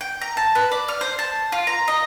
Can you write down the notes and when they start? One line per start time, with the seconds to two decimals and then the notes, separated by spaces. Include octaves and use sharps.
0.01 G5
0.21 A#5
0.37 A5
0.55 B4
0.72 D5
0.88 F6
1.01 C5
1.19 A5
1.52 F4
1.67 A#5
1.88 D#5